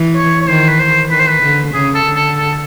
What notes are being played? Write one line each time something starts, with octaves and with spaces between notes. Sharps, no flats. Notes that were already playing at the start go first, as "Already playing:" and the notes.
Already playing: E3
C#5
C#5
D#3 C5
B4
C5
D#3 B4
C5
B4
D3
C#3 G#4
A4
D3
A4
A4